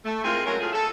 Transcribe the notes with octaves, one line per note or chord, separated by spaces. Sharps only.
A3
G#3 C4 E4 F4 G#4 A#4
F#3 G#3 A3 C#4 A#4
A2 F4 G#4
A4